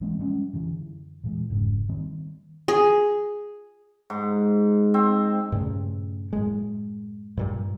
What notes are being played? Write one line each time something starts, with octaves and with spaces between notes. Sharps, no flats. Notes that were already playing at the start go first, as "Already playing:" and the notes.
E3 G#3 A#3 C4
F3 G3 G#3 C#4
F#2 D3 E3
A#2 E3 G#3
F1 G#2 C#3
D#3 G3 A#3 C4
G#4
G#2
C4
G2 A#2 C#3 A3
F#2 A2 G#3
G2 A#2 G3